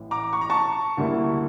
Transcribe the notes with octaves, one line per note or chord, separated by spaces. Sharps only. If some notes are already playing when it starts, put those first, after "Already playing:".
Already playing: A1 A2 E3
A#5 D6
C#6
A#5
A5 C#6
D2 D3 G3 A#3 E4